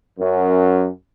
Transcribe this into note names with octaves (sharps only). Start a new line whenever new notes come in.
F#2